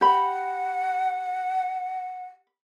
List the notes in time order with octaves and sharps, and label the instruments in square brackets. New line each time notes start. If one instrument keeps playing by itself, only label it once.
[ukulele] G4 B5 [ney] F#5